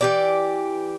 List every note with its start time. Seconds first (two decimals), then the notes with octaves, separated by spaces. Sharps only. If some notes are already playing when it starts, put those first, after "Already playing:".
0.01 E3 G4 D5